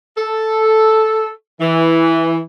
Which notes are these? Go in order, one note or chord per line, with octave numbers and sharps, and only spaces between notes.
A4
E3